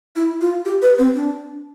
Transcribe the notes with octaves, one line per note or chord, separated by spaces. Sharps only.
E4
F4
G4
B4
C4
D4